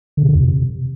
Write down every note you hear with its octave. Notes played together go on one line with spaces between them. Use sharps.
D3
C3
D3
F2
C3